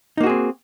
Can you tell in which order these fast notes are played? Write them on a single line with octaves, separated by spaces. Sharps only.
D#4 A#3 F#4 G#4 C4